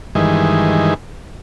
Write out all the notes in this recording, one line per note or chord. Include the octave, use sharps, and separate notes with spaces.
G2 D#3 E3 G#3